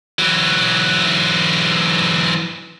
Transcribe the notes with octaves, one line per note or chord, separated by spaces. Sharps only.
E3 F#3